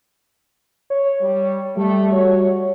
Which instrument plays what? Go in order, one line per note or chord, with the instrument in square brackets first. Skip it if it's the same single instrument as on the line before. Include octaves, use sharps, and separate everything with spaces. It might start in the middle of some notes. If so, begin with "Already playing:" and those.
[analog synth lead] C#5
[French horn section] G3
[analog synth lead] G3 [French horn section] A3
[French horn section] F#4 C#5